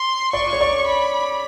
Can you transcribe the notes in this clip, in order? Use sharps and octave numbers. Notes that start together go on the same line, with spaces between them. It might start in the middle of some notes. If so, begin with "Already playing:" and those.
Already playing: C6
D5 C#6
C#5
D5
B5